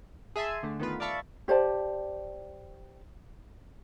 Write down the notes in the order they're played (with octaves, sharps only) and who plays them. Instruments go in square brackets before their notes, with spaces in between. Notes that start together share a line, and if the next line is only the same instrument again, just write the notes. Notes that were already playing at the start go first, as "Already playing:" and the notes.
[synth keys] G#4 E5 G#5 A5 C6
D3 A3
D#3 A3 B3 F4 B4
D5 E5 F5 A5 B5 C#6
[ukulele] G4 C5 D5 A5